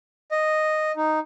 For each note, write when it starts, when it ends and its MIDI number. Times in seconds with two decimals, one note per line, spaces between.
0.31 0.92 75
0.96 1.19 63